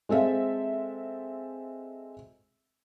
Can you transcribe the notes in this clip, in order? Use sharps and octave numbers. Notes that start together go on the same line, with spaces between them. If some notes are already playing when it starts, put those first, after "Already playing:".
G#3 C4 A4 E5 F5